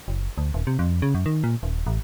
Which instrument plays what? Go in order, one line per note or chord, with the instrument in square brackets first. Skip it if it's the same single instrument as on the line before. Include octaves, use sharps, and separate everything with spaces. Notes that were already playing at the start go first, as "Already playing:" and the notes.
[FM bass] F#1
D2
D#1
C3
F2
C#3
F#2
D#3
A#2
D#1
A1